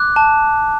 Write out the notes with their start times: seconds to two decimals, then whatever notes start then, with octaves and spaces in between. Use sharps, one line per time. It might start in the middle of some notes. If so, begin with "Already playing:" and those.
Already playing: D6 F#6
0.16 A5